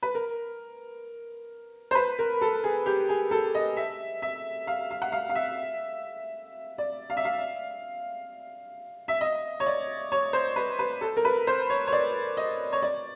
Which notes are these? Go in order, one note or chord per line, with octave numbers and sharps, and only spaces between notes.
B4
A#4
C5
B4
A#4
A4
G#4
G4
G#4
A4
D#5
E5
E5
F5
F5
F#5
F5
F5
E5
D5
F5
E5
F5
E5
D#5
C#5
D5
C#5
C5
B4
B4
A4
A#4
B4
C5
C#5
C#5
D5
D#5
C#5
D5